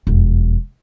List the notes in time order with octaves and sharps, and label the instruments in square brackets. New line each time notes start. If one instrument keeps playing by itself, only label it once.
[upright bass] E1 F2